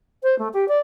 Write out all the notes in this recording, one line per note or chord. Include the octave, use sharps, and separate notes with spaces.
C5
A3
G4
D5